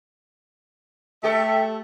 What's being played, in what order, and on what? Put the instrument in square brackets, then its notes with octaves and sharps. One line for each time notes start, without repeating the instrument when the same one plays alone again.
[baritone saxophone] A3 [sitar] G4 A4 [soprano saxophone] E5